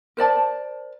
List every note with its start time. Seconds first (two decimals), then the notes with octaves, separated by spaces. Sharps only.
0.17 A#4 C5 D5 A5